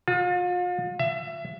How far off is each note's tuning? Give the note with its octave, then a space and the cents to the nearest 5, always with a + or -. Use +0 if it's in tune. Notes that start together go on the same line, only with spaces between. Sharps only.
F4 +40
E5 +25